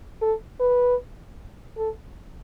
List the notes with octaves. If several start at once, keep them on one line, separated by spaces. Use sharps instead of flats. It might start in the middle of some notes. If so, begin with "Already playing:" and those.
A4
B4
A4